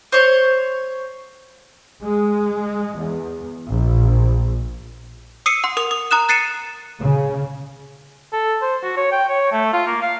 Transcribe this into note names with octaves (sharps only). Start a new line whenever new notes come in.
C5 C#5
G#3
E2
A#1
D#6 E6 C7 C#7 D#7
F#5 C6
A#4 D#6 F7
D#6
A#5 D#6 F#6 E7
F#6 A6 C7 C#7 D#7 E7
C#3
A4
C5
F#4
C#5
G5
C#5
A3
F4
A#3
F5